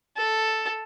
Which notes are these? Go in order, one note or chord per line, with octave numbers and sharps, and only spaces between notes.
A4